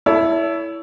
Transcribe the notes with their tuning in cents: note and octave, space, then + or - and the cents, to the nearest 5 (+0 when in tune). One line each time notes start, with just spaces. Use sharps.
E4 +0 A4 +0 C#5 +40